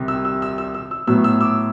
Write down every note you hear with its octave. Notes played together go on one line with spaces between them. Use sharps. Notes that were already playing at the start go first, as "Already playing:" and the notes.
Already playing: C2 C3 D#3
E6
E6
E6
E6
E6
E6
A2 F#3 B3 E6
E6
D6 E6